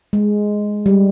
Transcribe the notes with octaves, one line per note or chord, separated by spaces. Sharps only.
G#3
G3